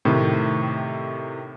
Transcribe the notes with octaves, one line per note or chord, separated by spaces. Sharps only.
A2 C3 D#3